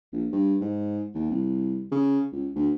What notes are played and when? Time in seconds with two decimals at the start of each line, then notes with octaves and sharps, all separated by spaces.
0.13 A#1
0.32 G2
0.61 G#2
1.15 D#2
1.31 C2
1.92 C#3
2.32 C#2
2.56 D2